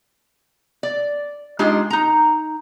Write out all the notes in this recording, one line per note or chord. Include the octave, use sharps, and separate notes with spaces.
D5
G#3 D4 D#4 F4 G4
D#4 A#5